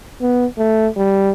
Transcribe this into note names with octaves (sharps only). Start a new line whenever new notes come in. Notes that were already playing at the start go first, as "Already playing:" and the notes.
B3
A3
G3